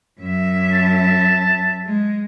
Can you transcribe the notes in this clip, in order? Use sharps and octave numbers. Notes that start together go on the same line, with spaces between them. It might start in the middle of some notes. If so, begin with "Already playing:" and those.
F#2 E5
A5
G#3